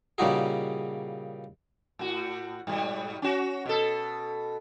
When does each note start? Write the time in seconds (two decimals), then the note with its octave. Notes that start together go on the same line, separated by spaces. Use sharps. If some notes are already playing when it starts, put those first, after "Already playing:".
0.18 A#2 C#3 G3 D#4 F#4 G#4
1.99 A2 F#4
2.67 G#2 B2 G3
3.22 C#4 F#4
3.66 B2 A4